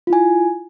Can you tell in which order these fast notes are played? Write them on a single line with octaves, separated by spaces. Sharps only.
F4 E4 G#5